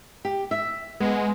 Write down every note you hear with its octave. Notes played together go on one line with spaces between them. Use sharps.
G4
E5
G#3 B3